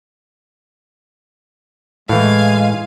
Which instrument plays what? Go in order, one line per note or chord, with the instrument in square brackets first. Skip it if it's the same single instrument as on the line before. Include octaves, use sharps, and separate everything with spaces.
[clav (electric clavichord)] A2 E3 [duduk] G#3 [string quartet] F5 G#5